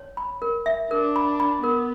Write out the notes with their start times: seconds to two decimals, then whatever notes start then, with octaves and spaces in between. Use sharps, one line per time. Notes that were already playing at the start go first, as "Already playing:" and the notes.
Already playing: C#5
0.17 B5
0.42 A#4
0.66 E5
0.91 D4 A#4
1.16 B5
1.40 B5
1.63 B3 A#4